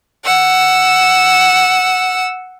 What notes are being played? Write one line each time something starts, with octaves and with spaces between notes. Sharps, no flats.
F#5 E6